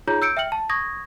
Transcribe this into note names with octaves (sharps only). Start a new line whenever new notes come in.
D#4 F4 G#4 C#5 A#5 G6
E6 G6 C#7 D7
E5 G5 F6 C#7 F#7
A5
C#6 D#6 G#6 A#6